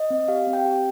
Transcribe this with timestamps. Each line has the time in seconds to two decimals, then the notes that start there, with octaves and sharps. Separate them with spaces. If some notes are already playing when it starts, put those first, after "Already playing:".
Already playing: D#5
0.10 C4
0.28 G4 F5
0.47 C4
0.53 G5
0.65 G4